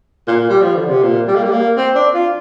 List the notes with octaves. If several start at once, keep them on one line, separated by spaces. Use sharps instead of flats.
A#2
G3
F3
D3
C3
A#2
G3
A#3
G3
A#3
C4
D4
F4